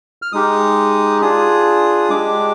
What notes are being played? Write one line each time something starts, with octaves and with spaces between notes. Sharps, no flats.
F6
G#3 D#4 G4 D#6
D4 F4 G#4 D#6
G#3 D4 G4 D6